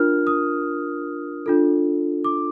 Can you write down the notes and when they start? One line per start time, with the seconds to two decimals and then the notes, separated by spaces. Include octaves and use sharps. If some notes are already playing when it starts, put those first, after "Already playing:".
Already playing: D4 F4 A#4 F6
0.27 D#6
1.46 D4 F4 A4
2.24 D6